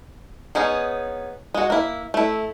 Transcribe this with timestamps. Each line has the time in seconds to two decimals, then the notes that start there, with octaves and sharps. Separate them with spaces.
0.55 B3 C#4 D#4 G#4
1.54 G#3 F#4
1.70 A#3 E4
2.14 A3 E4